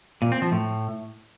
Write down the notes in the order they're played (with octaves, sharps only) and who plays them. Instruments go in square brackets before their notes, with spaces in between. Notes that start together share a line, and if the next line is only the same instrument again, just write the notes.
[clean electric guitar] A#2
C4
F3
A2